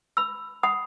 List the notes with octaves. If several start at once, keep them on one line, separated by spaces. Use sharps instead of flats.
B5 E6
F#5 B5 D#6